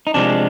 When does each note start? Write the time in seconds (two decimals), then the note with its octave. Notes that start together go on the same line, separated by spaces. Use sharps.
0.07 D#4
0.14 C3 F3 G#3 D4